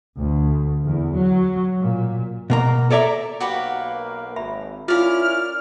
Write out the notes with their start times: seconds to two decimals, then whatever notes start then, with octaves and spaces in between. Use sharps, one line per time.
0.16 D2
0.84 E2
1.15 F#3
1.80 A#2
2.50 B2 A#3 A#5
2.90 A4 C#5 D5 E5 A#5
3.40 B1 A#3 F#4 G4 B4
4.36 G#1 E5 A#5 B5
4.88 C#4 E4 F4 A#4 D5 F5 F6